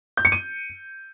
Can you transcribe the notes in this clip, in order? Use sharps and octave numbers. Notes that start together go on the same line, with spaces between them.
G6
C#7
D#7